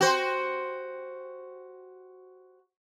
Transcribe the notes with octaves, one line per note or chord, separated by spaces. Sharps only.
F#4 C5